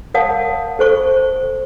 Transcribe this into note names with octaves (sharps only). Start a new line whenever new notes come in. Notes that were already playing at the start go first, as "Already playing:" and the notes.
A#4 C#5 F5 F#5 A5 D#6
A4 C5 C#6